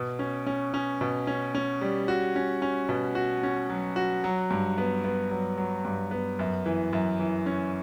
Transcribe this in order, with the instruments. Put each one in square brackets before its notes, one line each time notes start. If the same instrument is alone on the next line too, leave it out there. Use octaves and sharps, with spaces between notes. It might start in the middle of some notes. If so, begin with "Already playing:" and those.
Already playing: [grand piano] B2
C#4
C#4
C#4
B2
C#4
C#4
G3
F#4
C#4
C#4
B2
F#4
C#4
F#3
F#4
F#3
G2
B3
B3
F#3
F#3
G2
B3
F#2
E3
F#2
E3
C#4